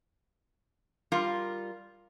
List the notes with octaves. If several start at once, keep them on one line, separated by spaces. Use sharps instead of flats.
G3 F4 A#4